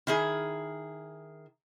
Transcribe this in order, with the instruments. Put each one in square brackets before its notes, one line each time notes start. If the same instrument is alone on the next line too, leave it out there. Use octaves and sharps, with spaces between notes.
[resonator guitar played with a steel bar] D#3 E4 G#4